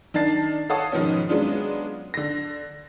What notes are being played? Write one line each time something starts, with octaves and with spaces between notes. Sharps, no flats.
D#3 D4 D#4 A5 A6 C7
A4 C#5 F5 F#5 A5 D#6
G#2 B2 D#3 F3 B3 C#4
F#3 G#3 B3 C#4 D4 F4
D3 A#6